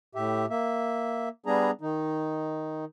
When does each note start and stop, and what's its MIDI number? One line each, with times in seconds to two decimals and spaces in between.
0.15 0.46 45
0.15 0.46 67
0.15 0.46 76
0.50 1.29 58
0.50 1.29 76
1.46 1.71 55
1.46 1.71 59
1.46 1.71 62
1.46 1.71 68
1.46 1.71 82
1.81 2.85 51
1.81 2.85 63